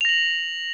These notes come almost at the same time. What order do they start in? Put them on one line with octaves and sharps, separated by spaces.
F7 A#6 F#7